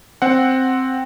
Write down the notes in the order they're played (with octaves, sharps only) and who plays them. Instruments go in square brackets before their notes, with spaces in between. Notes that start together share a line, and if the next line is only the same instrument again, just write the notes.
[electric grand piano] C4 F#5